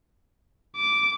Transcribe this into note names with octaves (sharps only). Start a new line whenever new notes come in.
D6